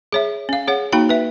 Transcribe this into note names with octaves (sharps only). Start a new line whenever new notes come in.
G#4 C#5 E5
C#4 F5
G#4 C#5 F#5
A#3 D#4 F#4 G5 B5
B4 E5